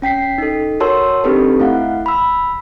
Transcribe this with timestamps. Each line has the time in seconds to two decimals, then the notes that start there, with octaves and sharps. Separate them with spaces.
0.02 C#4 G5 B6 C7
0.38 D#4 A4
0.80 F#4 A#4 C#5 A5 C6 E6
1.24 C4 D4 D#4 G4 A4 B4
1.60 A3 E4 F5 F#5
2.06 B5 E6